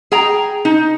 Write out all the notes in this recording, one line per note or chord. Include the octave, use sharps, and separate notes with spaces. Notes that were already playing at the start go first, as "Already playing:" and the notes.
G#4 G5 A#5
D#4